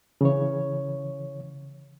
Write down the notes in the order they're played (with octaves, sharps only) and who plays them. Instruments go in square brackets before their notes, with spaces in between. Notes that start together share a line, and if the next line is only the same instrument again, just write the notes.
[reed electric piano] C#3 E3 C#5